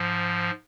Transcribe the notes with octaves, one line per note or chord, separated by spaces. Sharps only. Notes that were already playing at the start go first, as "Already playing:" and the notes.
Already playing: G#2 F3